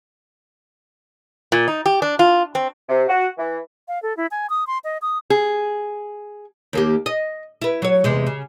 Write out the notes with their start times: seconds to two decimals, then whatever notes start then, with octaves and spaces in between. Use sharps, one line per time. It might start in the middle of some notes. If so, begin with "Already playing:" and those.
1.52 A#2
1.68 D#4
1.86 G4
2.02 D4
2.19 F4
2.55 C4
2.88 C3
3.08 F#4
3.37 E3
3.88 F5
4.02 A4
4.17 E4
4.31 G#5
4.50 D#6
4.67 C6
4.84 D#5
5.02 D#6
5.30 G#4
6.73 D#2 A#3 G4
7.06 D#5
7.62 E4 B4
7.82 F#3 C#5
8.04 E2 C3 G#3
8.27 C#3